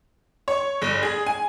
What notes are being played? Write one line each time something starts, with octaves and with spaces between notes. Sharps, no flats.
C#5
G1
G#4
G#5